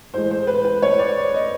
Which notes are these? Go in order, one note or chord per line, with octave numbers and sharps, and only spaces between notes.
A2 E3 G#3 C5
C5
B4
B4
C#5
D5
D#5